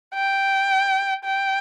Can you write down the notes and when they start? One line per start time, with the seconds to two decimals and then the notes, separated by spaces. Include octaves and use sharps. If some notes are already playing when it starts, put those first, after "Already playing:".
0.14 G5
1.25 G5